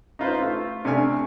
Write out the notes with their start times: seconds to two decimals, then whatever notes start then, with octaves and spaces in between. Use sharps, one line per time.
0.19 D#4 F4 B4 C5
0.41 A3 F4
0.85 C3 A3 D4 G#5 F6